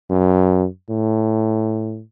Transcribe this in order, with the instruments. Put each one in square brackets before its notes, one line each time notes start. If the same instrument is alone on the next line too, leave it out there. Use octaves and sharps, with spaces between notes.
[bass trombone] F#2
A2